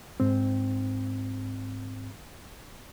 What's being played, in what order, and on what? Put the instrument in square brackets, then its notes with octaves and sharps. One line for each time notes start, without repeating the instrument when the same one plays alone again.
[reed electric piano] G#2 C4